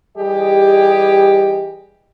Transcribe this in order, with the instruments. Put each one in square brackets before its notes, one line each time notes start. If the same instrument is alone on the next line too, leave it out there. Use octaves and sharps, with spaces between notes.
[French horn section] E3 G3 G4 G#4 D#5